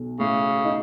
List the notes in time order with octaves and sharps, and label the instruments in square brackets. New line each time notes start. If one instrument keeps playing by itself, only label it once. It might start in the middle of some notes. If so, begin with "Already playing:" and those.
Already playing: [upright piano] B1
[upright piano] A2 [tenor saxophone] C#3
[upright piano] D#4